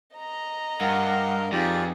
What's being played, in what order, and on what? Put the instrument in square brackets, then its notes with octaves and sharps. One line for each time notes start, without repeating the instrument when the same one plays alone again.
[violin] D#5 A#5
[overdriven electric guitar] G2 [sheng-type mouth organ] A#4 F5 [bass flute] F#5
[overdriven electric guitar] F2 [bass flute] D#4 [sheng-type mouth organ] F4 G4 D5 [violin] G#4 B4